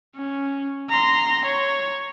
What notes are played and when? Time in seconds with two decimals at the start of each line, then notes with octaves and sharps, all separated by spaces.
0.16 C#4
0.90 A#5 C6
1.45 C#5